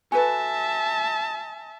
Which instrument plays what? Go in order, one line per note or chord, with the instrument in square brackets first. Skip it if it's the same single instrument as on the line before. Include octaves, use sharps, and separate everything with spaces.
[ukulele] F#4 A4 B4 [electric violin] E5 A5 [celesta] G#5